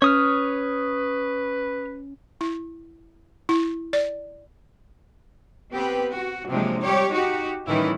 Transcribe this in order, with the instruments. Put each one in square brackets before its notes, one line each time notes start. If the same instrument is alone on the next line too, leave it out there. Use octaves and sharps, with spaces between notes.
[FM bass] C#4 [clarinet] B4 [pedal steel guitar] C#5 D#6 F6
[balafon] E4
E4
D5
[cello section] B3 C4 G4 B4
F#4
C3 F3 F#3 G#3 A#3 D4
G3 G4 C#5
D#4 F#4 G4
A2 D#3 E3 G3 C#4 E4